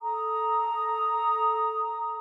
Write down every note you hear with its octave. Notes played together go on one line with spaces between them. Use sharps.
A4 A#5 D#6